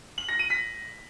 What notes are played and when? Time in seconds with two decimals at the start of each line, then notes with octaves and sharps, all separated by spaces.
0.18 F#7
0.29 A#6
0.39 D#7
0.50 B6